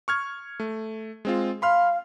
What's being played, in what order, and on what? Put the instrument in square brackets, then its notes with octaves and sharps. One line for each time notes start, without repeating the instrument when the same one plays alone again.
[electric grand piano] C#6 F6 G#6
A3
G#3 C4 F4
[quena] F5 [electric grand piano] B5 C6 F6